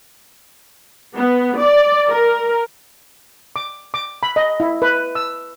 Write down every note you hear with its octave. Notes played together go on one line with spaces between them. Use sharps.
B3
D5
A#4
D6
D6
B5
D#5
E4
B4
E6